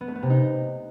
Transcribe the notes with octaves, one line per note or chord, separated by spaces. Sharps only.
B3
A3
B3
C3
D#4